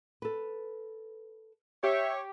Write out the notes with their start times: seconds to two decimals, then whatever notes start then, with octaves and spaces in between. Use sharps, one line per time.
0.22 A4 B4
1.83 G4 C#5 E5